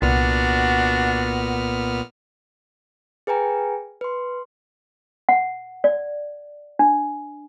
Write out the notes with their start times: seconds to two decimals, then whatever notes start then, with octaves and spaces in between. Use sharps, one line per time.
0.02 C2 A#2 B3 D4 F#4 F6
3.27 G#4 B4 G5 G#5 A#5
4.01 B4 C6
5.29 F#5
5.84 D5
6.79 D4